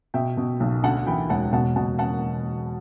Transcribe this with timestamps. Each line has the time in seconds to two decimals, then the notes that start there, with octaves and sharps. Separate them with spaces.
0.14 B2 E5 G5
0.37 B2
0.60 B1
0.84 D2 F#5 A5
1.07 E3 G5 B5
1.29 E1 F#5 A5
1.53 B2 F#5 A5
1.76 B2 F#5 A5
1.99 F#5 A5